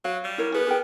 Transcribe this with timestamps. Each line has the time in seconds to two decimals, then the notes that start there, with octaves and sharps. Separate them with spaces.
0.05 F#3 F5
0.24 G3
0.38 E4 A#4 C#5
0.54 B3 G#4 B4
0.66 G#4 A#4 G5